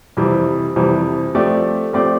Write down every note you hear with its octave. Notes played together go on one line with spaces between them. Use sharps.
F2 C3 E3 G3
F2 C3 E3 G3
F3 A3 C4 G4 D5
F3 A3 C4 G4 D5